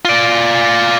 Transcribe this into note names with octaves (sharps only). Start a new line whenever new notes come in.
F4 D5